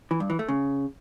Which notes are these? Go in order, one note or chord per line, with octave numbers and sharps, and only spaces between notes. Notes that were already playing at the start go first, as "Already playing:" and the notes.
E3
G2
E3
A3
C#3